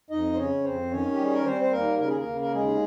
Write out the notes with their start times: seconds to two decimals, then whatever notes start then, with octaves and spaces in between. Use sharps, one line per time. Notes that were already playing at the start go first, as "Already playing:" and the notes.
0.10 F2 D#4 D#5
0.33 C5
0.37 C#3 C#4 C#5
0.64 F2 C4 C5
0.91 D#3 C#4 C#5
1.12 G4
1.18 G3 G#4
1.34 A#4
1.45 G3 C4 C5
1.61 C5
1.72 D#2 A#3 A#4
1.99 C#3 A#4
2.08 G#4
2.18 A#3 A#4
2.26 C#3
2.41 A#4
2.52 D#2 G#3 G#4